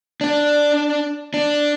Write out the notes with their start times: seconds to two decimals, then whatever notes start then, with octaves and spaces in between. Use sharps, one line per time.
0.21 D4 D5
1.34 D4